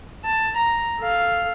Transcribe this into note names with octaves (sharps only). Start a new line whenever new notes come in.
A5
A#5
A4 F5